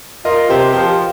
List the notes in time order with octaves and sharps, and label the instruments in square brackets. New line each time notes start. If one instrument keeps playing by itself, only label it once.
[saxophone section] F4 [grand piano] A#4 D#5
[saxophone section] C3 [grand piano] G4 C5
[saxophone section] F3 [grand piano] G4 C5